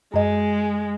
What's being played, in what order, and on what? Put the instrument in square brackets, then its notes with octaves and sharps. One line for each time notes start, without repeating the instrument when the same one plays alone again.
[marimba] F#2 D#5 [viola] G#3